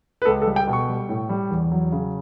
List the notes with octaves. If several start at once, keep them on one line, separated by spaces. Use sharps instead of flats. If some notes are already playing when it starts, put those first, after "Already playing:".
B4
C#2 A4
A4
G3
G5
B2
C#6
G3
A2
G3
E2
F#3
C#3